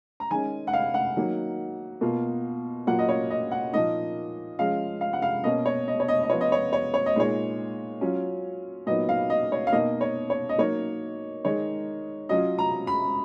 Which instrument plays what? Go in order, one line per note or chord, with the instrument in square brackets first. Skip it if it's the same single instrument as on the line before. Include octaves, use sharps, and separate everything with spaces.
[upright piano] A#5
D#3 G#3 C#4 G#5
F#5
F5
F#5
D#3 F#3 A#3
B2 A#3 F4
A#2 F#3 A#3 F4 F#5
D#5
C#5
D#5
F#5
A#2 F3 A#3 D#4 D#5
F3 G#3 C#4 F5
F5
F#5
F5
B2 A#3 C#4 D#5
C#5
D#5
C#5
D#5
D#5
F3 B3 F4 C#5
D#5
C#5
C#5
C#5
D#5
A#2 G#3 D#4 C#5
F#3 C#4 F4
A#2 F#3 B3 D#4 D#5
F5
D#5
C#5
F5
B2 A#3 D#4 D#5
C#5
C#5
D#5
F#3 A#3 D#4 C#5
D#3 G#3 D#4 C#5
F#3 C#4 F4 D#5
A#5
B5